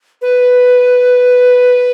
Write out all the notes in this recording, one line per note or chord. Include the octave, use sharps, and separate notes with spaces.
B4